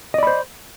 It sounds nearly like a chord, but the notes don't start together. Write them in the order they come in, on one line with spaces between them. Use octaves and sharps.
D#5 D5 B5 C5